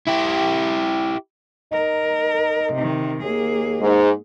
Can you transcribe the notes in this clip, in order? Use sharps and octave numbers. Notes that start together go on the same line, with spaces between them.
E4 G4
D#4 A#4
C3 D#3
D#2 A#3 G#4
G#2